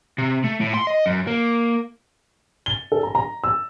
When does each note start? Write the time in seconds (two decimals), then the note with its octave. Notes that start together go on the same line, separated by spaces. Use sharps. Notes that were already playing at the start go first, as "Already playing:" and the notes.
0.18 C3
0.44 A3
0.61 A2
0.74 C6
0.87 D#5
1.06 F#2
1.27 A#3
2.66 G7
2.92 A4
3.03 A#5
3.15 A#5
3.44 E6